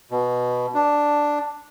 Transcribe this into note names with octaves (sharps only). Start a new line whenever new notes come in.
B2
D4